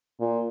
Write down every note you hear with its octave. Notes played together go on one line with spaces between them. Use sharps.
A#2